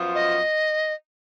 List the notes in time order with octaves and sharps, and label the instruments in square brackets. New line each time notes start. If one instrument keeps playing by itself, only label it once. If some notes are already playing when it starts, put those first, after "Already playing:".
Already playing: [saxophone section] F#2 F3 B3 F4
[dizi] D#5